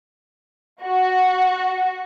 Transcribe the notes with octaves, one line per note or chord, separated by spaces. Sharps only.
F#4